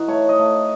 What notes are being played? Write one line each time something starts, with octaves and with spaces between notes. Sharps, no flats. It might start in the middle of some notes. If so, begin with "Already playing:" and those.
Already playing: E3 D#4 F#4
A3 C#5
D#5
A3